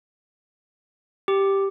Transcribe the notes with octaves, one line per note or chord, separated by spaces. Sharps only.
G4